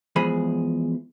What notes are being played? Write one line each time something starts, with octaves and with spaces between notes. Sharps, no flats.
E2 F3 G#3 G#4 B5